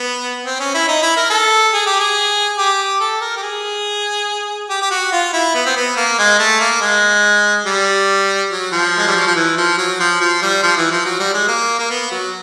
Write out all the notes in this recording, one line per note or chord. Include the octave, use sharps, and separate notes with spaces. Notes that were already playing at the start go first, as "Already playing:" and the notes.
Already playing: B3
C4
C#4
E4
D#4
E4
A#4
A4
G#4
G4
G#4
G4
A4
A#4
G4
G#4
G4
G4
F#4
F4
E4
B3
C4
B3
A#3
G#3
A3
A#3
G#3
G3
F#3
F3
G#3
G3
F#3
F3
E3
F3
F#3
F3
F3
G3
F3
E3
F3
F#3
G3
G#3
A#3
A#3
B3
F#3